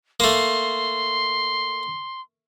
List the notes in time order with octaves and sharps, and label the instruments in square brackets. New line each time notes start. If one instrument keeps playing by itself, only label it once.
[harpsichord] A3 A#3 [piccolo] C6